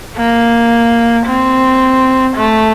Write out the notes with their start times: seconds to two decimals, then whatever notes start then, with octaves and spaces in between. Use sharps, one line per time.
0.17 A#3
1.26 C4
2.37 A3